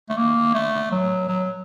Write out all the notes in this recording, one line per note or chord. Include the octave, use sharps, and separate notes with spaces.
A3
A#3
A3
F#3
F#3